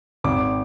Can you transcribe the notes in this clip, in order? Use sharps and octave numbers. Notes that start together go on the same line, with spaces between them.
G#1 D6